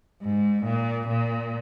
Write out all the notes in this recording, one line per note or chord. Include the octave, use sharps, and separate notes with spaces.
G#2
A#2
A#2